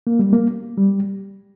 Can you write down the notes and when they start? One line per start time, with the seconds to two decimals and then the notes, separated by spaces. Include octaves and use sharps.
0.07 A#3
0.19 G3
0.33 A#3
0.77 G3